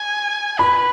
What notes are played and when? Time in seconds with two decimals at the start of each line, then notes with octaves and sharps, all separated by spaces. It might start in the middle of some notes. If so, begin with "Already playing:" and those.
Already playing: G#5
0.59 B4 B5